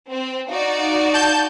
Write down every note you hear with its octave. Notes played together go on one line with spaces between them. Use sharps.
C4
D#4 F#4 D5 F5
A5 G6